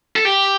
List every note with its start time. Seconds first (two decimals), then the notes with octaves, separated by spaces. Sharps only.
0.16 A4
0.25 G4